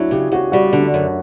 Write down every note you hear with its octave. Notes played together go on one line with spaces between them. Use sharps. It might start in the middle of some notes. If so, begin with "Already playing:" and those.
Already playing: F#3 D4 E4
C#3 G4
C#3 F#4
G3 F#4
D3
D4
F#2